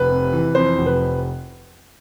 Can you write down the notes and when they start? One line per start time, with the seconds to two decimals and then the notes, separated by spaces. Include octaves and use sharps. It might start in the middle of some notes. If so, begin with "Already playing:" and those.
Already playing: F1 B4
0.09 C3
0.33 E3
0.55 F2 C5
0.78 F1
0.86 B4